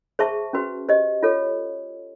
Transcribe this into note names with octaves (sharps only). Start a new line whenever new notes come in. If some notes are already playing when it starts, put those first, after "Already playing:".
G#4 C5 E5 A5 C#6
C#4 F#4 B4
G4 C5 D#5
F4 A4 C#5